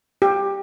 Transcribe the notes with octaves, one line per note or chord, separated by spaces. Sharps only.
G4